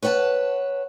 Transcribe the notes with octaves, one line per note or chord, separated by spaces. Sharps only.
B4 C#5 F#5 G#5 A5